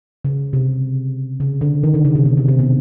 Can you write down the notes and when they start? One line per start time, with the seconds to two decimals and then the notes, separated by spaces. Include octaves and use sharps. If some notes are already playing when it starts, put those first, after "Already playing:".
0.24 C#3
0.53 C3
1.40 C#3
1.61 D3
1.83 D#3
1.94 D3
2.05 C#3
2.15 C3
2.25 B2
2.37 C3
2.48 C3
2.59 B2